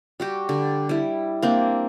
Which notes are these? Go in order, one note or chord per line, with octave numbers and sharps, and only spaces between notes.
G3 F#4 G4
D3 G3
G3 E4
A#3 C4 D4